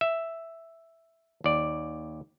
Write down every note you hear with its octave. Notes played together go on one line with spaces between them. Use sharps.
E5
D#2 D5